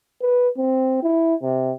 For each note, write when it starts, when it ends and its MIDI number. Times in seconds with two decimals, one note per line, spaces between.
0.21 0.49 71
0.57 1.01 60
1.03 1.35 64
1.42 1.72 48